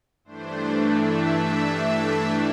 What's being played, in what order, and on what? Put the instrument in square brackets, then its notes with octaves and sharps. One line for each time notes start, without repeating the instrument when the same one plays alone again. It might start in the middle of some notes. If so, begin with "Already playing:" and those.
[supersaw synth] G2 E3 A3 D4 C5
E5